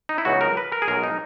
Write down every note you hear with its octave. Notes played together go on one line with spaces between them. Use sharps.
D#4
E4
C#2 C#3 F#3 B3 D#4 F#4
A#4
B4
A#4
G#4
B1 B2 G#3 A#4
D#4